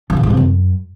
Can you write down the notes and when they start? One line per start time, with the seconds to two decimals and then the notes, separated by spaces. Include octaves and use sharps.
0.10 D3
0.17 A#2
0.23 G#2
0.30 C3
0.37 F#2